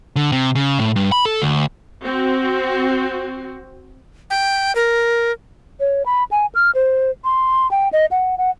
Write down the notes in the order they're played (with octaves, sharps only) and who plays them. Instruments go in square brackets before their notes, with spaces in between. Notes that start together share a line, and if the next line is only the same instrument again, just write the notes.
[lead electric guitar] D3
C3
C#3
A2
G2
B5
A4
D2
[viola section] C4 F#4
[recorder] G5
A#4
[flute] C#5
B5
G#5
F6
C5
C6
G5
D#5
F#5
F#5